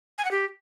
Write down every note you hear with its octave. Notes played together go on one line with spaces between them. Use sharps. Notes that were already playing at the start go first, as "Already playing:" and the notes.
G#5
F#5
G4